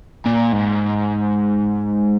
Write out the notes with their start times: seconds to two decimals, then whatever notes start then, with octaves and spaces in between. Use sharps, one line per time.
0.26 A#2
0.52 G#2